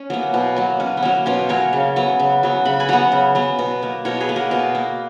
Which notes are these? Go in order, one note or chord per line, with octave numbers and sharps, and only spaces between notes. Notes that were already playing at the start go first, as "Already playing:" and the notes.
Already playing: C#4
F#3 A#3 B3
B2
F#3 A#3
B2 C#4
B3
F#3 A#3 C#4
B2 C#4 F4
F#3 A#3 A#4 C#5
C#3
F#3 B3
C#3
F#3 B3
C#3 B5
G#5 B5
F#3 B3 F#5 A#5
C#3
F#3 B3
B2
A#3
B2 A#4 C#5
G#4 B4
A#3
F#4 A#4
B2
A#3